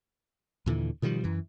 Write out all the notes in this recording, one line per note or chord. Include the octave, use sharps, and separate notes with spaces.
D#2 A#2 D3 E3
B2 D#3 F3 G3
F#2 E3